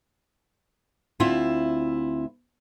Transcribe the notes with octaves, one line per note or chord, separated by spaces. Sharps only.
D2 C4 E4 F4 E5